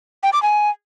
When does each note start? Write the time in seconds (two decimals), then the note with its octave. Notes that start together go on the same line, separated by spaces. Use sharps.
0.23 G5
0.33 D6
0.43 G#5